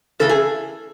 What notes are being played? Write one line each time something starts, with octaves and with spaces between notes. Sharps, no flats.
C#3 E3 A3 A4
G#4